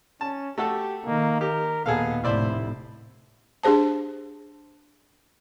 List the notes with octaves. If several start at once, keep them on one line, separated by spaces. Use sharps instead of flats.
C#4 A5
A3 F#4 G4 A4
D#3 A#3
G4 A#4
D#2 A#2 B3 G#4 A4 F5
F1 A2 E4 C5 D5 E5
D4 G4 G#4 C5 A5